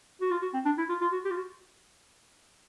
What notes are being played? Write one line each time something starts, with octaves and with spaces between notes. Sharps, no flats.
F#4
F4
F#4
C4
D4
E4
F4
F4
F#4
G4
F4
F#4